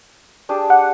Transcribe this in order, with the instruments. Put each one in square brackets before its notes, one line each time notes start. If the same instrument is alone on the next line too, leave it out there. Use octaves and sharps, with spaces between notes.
[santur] D4 G4 G#4
[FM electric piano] F#5